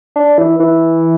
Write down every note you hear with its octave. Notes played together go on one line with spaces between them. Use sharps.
D4
E3
E3